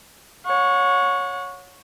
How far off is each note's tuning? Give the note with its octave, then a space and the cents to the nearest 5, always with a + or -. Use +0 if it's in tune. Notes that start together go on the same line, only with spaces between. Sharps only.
C#5 +0 F#5 -35